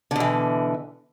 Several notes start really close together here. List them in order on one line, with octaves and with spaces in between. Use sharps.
D3 B2 E3